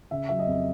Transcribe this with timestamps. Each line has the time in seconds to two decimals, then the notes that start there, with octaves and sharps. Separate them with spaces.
0.11 C#3 E5
0.29 F#3 E5
0.39 D#5
0.48 F2